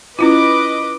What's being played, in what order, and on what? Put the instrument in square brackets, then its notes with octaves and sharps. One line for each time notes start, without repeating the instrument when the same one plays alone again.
[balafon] C#4 E4 F4 [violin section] B4 D#5 D6